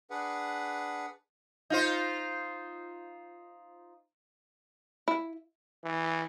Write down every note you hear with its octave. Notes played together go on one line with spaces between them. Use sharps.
D4 G#4 B4 F#5
D#4 F4 C5
E4
E3